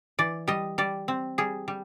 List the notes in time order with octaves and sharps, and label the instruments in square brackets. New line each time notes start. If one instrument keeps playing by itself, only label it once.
[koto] E3 D5
G3 D#5
G3 D5
C4
G3 G#4
G3